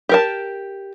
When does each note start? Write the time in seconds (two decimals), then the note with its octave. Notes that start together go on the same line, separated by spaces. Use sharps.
0.09 G4 A#4 A5